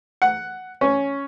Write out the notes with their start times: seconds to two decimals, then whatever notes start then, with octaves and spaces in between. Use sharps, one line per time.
0.22 F#5
0.81 C#4